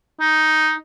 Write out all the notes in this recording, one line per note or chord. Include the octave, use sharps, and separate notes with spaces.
D#4